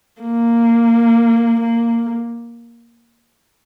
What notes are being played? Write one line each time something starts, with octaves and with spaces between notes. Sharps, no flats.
A#3
A#3